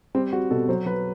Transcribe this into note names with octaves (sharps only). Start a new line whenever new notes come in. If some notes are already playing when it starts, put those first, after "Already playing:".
G3 C4
G3 F#4
B2 A4
F#3 C5
F#3 B4